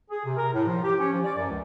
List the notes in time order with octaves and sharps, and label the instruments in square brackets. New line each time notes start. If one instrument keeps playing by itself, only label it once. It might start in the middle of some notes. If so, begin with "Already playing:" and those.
[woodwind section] G#4
C3
A#4
A2
F3
G4
C#4
F3
D5
F#2
C#2